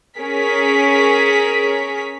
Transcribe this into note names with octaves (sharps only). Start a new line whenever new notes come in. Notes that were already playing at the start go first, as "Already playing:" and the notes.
C#4 G#4 A#4 B6